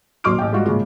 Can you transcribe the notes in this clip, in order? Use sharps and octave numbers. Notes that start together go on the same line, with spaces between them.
D#1 F#3 C6 D6 F6 D7
A1 G5
G#2 G3 F4 F#4
A#2 C#3 F3 G#3